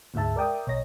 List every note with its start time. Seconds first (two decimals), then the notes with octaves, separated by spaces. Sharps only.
0.14 D2 G#2 G#3 E5 A5
0.36 A#4 D5 E5 G5 D#6
0.67 B1 C#5 D#5 A#6